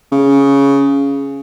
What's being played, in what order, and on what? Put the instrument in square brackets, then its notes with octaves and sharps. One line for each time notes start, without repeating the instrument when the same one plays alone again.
[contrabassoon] C#3